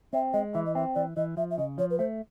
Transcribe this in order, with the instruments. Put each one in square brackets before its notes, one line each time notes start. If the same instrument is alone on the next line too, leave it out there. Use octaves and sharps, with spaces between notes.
[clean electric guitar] C4 [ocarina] E5
[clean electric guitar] G#3 [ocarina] D#5
[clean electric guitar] E3 [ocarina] E5
[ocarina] D#5
[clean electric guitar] C4 [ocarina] E5
[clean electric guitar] E3 [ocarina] D5
[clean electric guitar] E3 [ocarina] D#5
[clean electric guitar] F3 [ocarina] E5
[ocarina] E5
[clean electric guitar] C#3 [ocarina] D#5
[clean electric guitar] F3 [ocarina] C#5
[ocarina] B4
[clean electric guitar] A3 [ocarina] C5